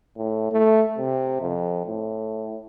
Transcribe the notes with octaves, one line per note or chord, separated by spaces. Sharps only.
A2
A3
C3
F2
A2